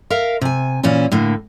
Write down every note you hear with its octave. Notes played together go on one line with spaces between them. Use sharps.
A#4 E5 F5
C3 G#5
A#2 E3 C#4 E4
A2 D3 A#3